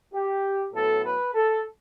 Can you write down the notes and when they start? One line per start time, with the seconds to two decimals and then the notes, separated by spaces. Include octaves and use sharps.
0.14 G4
0.74 A2 F#3 B3 A4
1.05 B4
1.34 A4